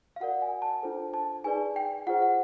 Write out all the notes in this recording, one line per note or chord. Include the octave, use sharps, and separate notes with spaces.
F5
F#4 A#4 D5 F#5
G#5
A5
D4 F4 A4 C5
A5
D#4 G#4 B4 D5 G#5
G5
F4 G#4 C5 F#5
F#5